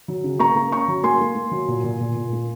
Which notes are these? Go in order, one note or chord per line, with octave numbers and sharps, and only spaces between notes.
F#3
C#3
A#3 A#5 C#6
A#3
C#4 A#5 C#6
F#3
A#3 G#5 C6
A#3
A#3
F#3
A#2
A#2
A#2
A#2
A#3